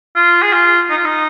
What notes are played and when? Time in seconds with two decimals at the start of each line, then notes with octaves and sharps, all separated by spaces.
0.16 F4
0.42 G#4
0.53 F4
0.90 D#4
0.98 F4
1.05 D#4